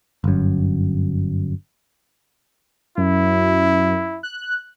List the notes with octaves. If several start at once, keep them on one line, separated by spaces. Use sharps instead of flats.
G1 F#2
F#2 E4
F#6